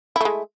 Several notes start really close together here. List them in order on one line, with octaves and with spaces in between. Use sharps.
E4 A3 G#3